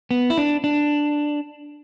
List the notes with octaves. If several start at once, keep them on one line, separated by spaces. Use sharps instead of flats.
B3
E4
D4
D4